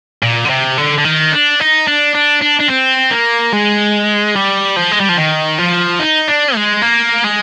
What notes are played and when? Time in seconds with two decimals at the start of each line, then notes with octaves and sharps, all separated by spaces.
0.23 A#2
0.45 D3
0.50 C3
0.78 D3
0.98 D3
1.05 D#3
1.33 D4
1.61 D#4
1.87 D4
2.15 D4
2.42 D4
2.60 D4
2.70 C4
3.11 A#3
3.53 G#3
4.35 G3
4.76 F3
4.91 G#3
5.00 G3
5.09 F3
5.17 D#3
5.59 F3
6.00 D#4
6.28 D4
6.55 G#3
6.82 A#3
7.24 G#3